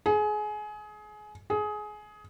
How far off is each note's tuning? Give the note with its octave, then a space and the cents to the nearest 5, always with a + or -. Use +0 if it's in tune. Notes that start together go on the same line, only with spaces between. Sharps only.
G#4 +25
G#4 +20